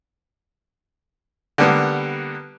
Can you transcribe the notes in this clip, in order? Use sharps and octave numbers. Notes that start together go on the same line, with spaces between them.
D3 G3 A#3 B3